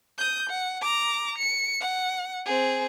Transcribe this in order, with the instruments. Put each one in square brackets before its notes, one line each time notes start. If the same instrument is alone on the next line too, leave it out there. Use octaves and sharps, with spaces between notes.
[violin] D#6 G6
F#5
A#5 D6
C#7
F#5
C4 G#4